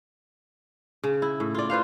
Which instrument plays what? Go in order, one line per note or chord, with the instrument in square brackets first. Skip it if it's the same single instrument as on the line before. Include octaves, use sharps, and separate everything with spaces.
[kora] C#3
E4
A2
F4 D5
F4 B4 C5 F5